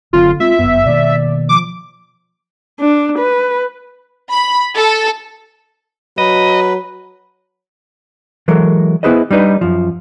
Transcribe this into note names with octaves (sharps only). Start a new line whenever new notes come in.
F#1 D3 F#3 C4 F4
G#3 C4 F4 E5
G1 F#2 B3
B2 D#3 A#3 D5
F3 D6
D4
B4
B5
A4
F#3 B4 D#5
E3 F#3 G#3 A4 A#4
B3 E4 G#4 B4 C5 D#5
G3 D4 D#4 B4
F#2 F3